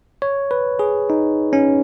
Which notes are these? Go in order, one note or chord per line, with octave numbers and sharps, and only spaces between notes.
C#5
B4
G#4
D#4
C#4